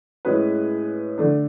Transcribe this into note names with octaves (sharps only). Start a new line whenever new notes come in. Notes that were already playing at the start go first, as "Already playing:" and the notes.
A2 G#3 C#4 G#4 B4
D3 A3 D4